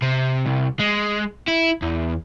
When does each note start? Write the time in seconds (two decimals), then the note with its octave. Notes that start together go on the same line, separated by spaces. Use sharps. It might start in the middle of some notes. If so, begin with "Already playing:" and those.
0.02 C3
0.46 C2
0.79 G#3
1.48 E4
1.82 E2